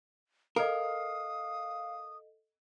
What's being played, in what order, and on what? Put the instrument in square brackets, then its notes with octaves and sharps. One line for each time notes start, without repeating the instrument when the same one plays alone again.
[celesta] A4 D#5 [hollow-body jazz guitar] A#4 [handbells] F5 [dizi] D#6